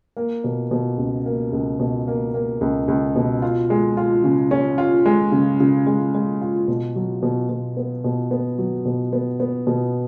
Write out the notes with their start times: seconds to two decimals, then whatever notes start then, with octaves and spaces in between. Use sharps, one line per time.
0.17 A#3
0.44 B2
0.71 B2
0.98 C#2
1.26 A#3
1.53 C#2
1.80 B2
2.07 A#3
2.34 A#3
2.61 C#2
2.88 C#2
3.16 B2
3.42 F4
3.70 G#3
3.97 F4
4.24 C#3
4.51 C#4
4.78 F4
5.06 G#3
5.32 C#3
5.60 C#3
5.87 G#3
6.15 G#3
6.41 F4
6.68 B2
6.96 F#3
7.23 B2
7.49 B2
7.77 B3
8.04 B2
8.31 B3
8.58 F#3
8.85 B2
9.13 B3
9.40 B3
9.67 B2